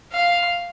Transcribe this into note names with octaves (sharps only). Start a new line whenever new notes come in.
F5